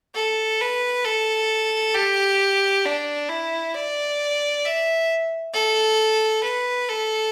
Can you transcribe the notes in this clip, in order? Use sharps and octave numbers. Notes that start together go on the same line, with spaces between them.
A4
B4
A4
G4
D4
E4
D5
E5
A4
B4
A4